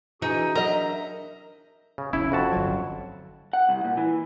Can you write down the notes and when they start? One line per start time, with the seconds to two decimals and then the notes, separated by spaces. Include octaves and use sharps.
0.22 E3 D4 D#4 F#4 G#4 G#5
0.55 F#3 D4 A#4 D#5 E5 A#5
1.98 C#3
2.13 F1 C#4 E4
2.32 F2 F#4 A5
2.53 G1 F#3
3.53 F#5
3.69 C2
3.84 A#2
3.97 E3